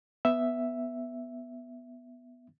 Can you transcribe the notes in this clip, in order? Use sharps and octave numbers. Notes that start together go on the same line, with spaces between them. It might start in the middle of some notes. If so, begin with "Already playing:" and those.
B3 E5